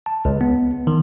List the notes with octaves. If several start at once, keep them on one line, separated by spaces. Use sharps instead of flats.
A5
C#2
B3
D#3